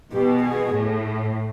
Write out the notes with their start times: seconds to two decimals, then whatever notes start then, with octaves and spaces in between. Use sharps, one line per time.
0.13 B2 G4
0.44 G#4
0.74 A2